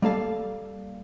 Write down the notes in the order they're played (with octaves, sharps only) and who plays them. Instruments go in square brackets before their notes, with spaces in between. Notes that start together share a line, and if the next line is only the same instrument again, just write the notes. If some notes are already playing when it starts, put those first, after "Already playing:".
[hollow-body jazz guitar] G3 A#3 A4 F5